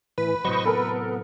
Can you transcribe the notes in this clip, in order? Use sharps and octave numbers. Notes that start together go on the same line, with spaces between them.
A2 E3 B4
A2 C3 F#3 C5 D#5 C#6
B3 A4 A#4